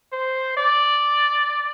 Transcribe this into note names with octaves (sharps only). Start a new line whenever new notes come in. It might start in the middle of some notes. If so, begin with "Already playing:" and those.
C5
D5